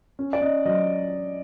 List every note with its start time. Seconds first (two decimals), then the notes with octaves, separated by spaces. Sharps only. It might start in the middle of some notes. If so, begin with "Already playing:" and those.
0.19 C#4
0.33 D5
0.41 C#4 D#5
0.65 F#3 D#5